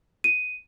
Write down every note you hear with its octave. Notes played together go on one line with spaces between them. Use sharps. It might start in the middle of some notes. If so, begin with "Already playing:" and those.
D#7